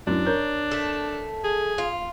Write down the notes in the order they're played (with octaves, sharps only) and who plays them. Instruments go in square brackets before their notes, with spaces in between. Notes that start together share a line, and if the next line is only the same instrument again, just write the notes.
[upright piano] F#2 E3 [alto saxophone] D4
[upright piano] A#4 C#5 G6
[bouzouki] A3 A4
[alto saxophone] G#4
[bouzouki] F4